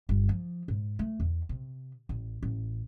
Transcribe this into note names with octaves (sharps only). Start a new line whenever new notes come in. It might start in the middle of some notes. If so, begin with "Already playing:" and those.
G1
F3
G#2
A3
E2
C3
A1
A1